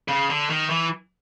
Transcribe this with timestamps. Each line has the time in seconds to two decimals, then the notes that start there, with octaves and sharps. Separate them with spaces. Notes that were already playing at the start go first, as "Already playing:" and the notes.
0.08 C#3
0.30 D3
0.50 D#3
0.70 E3